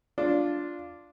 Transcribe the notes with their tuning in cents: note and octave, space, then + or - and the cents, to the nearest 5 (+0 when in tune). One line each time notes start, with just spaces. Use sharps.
D4 +0 F4 +0